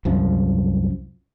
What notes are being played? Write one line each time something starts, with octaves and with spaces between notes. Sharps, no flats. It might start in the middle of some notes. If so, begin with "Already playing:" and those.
C2 F#2 F3